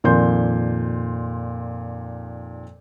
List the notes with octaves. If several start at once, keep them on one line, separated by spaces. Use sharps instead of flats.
F2 A#2 D#3 D5 C6 G6